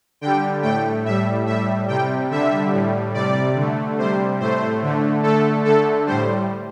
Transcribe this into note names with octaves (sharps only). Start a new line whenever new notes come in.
D3 G3 G5
A2 A3 G5
A2 G3 E5
A2 G3 E5
C3 G3 G5
D3 G3 E5
A2 G3
C3 G3 D5
D3 A3
C3 G3 C5
A2 A3 C5
D3 A3
D3 A3 A4
D3 A3 A4
A2 G3 C5